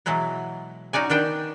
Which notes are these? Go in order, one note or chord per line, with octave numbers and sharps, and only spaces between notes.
B2 E3 F#3 G#3 B3
C#4 D#4 F#4 D5 G#5
D#3 B3 D4 G5